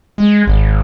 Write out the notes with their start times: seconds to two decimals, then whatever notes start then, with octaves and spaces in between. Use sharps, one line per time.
0.18 G#3
0.47 G#1